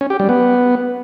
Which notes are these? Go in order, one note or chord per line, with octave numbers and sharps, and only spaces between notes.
C#4
G4
G3
B3